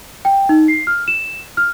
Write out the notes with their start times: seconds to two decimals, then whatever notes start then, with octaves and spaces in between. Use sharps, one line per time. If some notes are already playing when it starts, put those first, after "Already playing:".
0.25 G5
0.49 D#4
0.68 C7
0.87 F6
1.08 E7
1.57 F6